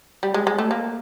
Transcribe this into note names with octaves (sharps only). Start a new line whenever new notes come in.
G3
G#3
G#3
A3
A#3